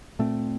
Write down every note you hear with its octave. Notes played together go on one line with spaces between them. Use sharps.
A#2 A3 C4